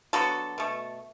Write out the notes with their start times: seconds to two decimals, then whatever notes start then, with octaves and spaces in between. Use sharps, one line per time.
0.13 D3 F#3 B3 F#4 A4
0.58 B2 A3